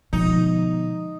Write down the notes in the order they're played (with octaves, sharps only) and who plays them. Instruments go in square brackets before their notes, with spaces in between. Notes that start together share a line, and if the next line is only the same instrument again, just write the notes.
[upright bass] B2 [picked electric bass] D3 F3 G#3 [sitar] D#4